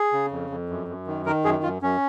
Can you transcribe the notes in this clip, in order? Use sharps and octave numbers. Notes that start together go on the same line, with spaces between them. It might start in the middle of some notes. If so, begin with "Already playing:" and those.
Already playing: G#4
C#3
F2
F2
F#2
F#2
D#3
D#3 A#4
F#2 G#4
F#2 F4
F#2 C#4